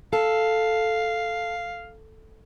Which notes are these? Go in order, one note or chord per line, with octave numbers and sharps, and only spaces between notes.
A4 F5